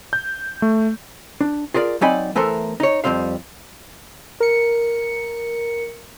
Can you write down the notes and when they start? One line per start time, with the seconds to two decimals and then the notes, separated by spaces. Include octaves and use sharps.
0.13 G6
0.62 A3
1.41 D4
1.74 F4 G#4 A#4 D5
2.01 F#3 C4 D#4 D5 G#5 B5
2.35 E3 A3 B3 A4 A#4 C5
2.80 D#4 C#5
3.04 F2 F3 G3 C4 F5
4.40 A#4 C#7